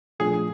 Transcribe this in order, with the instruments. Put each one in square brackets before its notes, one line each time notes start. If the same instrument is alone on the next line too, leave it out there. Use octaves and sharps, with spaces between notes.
[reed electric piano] A#2 F3 A3 D4 F4 [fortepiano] G#4